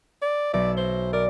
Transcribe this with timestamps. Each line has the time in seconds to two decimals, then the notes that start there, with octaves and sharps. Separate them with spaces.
0.22 D5
0.53 B1 D5 E5
0.77 C5
1.13 A#4 D5